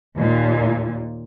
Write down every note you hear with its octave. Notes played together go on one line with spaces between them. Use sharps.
D#2 A#2